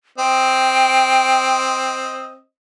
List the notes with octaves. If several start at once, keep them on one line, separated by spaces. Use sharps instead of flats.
C4 D#5 G5